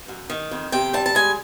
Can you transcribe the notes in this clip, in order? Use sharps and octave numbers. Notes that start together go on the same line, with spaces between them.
F#2
D#3
F2
C3 G5
G3 A5
A5
G#3 G#5